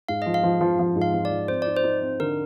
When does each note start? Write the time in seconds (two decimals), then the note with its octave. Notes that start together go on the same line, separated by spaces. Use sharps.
0.08 G#2 F5
0.22 F3 D#5
0.34 F5
0.43 F3
0.61 F3
0.79 F3
0.96 G#2
1.02 F5
1.14 F3
1.25 D5
1.31 F3
1.48 C4 C5
1.62 D#4 D5
1.77 C5
1.84 D#4
2.02 C4
2.20 D3 A#4